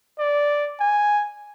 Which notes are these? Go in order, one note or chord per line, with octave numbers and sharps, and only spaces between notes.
D5
G#5